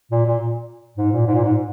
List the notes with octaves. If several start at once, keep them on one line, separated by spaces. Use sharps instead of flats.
A#2
A#2
G#2
A#2
G#2
A#2
G#2